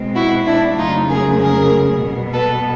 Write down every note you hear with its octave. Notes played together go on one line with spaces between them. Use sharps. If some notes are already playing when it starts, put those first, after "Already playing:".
Already playing: B2 G#3 C4
E4 F#4
D4 E4
F2 C#3 F#3 A3 D#4 F4
G#4 A#4
G#4 A#4
B2 G3 B3
A4 B4